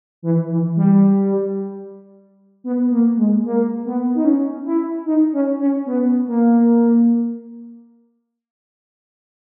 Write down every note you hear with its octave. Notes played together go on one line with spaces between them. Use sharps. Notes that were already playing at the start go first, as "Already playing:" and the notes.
E3
E3
G3
B3
A#3
G#3
A#3
B3
D#4
C#4
E4
D#4
C#4
C#4
B3
A#3